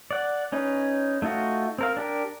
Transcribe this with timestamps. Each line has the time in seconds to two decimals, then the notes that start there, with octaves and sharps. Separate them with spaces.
0.11 D5 F#5
0.52 C#4 D#4 B4
1.22 A3 D#4 F4 F#4
1.78 C4 A#4 F5
1.97 D4 G4 A#4